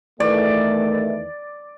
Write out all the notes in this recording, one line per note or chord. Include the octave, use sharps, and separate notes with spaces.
E2 D#3 E3 A3 D5